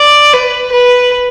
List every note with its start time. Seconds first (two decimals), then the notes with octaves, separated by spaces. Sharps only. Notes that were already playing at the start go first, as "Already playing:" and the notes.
Already playing: D5
0.33 B4
0.72 B4